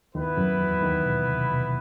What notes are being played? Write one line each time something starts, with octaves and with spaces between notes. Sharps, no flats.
D#2 D#3 B3 E4 B4
F#2 F#3
E2 E3
D#2 D#3
B2
C3
B2